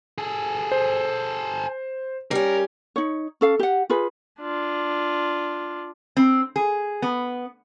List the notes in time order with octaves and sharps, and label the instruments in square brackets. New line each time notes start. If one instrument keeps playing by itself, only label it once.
[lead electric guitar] G#4 A4
[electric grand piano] C5
[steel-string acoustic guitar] G3 C#4 [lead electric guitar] A#4
[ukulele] D#4 C#5
C#4 A4 F5
G4 F#5
F4 G#4 B4
[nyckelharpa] D4 F4
[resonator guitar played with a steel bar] C4
G#4
B3